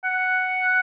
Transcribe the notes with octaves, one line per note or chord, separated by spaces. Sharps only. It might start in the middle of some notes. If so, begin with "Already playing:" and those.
F#5